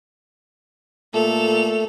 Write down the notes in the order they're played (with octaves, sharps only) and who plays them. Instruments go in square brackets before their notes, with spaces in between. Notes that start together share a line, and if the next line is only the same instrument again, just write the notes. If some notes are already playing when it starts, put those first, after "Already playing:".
[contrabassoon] A#2 [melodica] A3 [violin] A4 F7